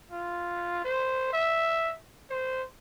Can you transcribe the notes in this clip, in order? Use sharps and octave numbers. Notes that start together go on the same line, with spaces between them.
F4
C5
E5
C5